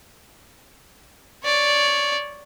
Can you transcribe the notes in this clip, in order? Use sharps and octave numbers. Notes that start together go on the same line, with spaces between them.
C#5 D5